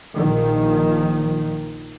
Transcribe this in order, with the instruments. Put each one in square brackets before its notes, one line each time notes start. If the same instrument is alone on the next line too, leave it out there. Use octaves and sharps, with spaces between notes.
[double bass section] A#1 A#2 D#3 F3